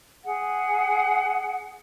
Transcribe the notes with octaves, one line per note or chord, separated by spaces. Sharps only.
G#4 F#5